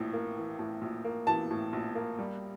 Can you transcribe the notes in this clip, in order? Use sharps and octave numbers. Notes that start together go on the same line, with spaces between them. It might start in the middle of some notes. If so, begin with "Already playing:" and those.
Already playing: A#1 A2 E3
A#3
E3
A2
A#1
A#3
E3 A5
A2
A#1
A#3
G3